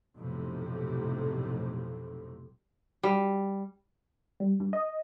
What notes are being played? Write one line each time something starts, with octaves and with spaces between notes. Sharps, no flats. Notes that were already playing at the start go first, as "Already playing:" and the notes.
B1 F2 A2 C3
G3
G3
G2
D#5